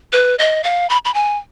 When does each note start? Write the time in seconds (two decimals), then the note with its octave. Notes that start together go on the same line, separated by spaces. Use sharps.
0.13 B4
0.39 D#5
0.64 F5
0.90 B5
1.05 B5
1.14 G#5